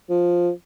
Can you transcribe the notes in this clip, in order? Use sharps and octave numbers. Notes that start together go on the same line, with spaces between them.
F3